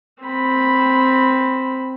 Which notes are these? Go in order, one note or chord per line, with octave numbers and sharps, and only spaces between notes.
C4 B5